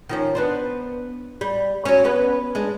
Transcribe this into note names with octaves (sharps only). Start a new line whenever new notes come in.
D#3 F3 C#4
B3 D4 C5
G3
F#3 C#4
B3 C#4 B4
G#3 D4